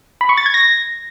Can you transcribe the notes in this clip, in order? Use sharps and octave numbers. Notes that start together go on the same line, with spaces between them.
B5
C#6
A6
G#6
A#6